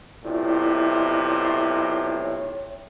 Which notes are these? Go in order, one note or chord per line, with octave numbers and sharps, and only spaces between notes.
B1 A2 C3 E4 F4 D5
C#5